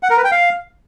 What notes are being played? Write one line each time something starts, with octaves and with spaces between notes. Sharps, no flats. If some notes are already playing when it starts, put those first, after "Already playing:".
F#5
A#4
B4
G5
F5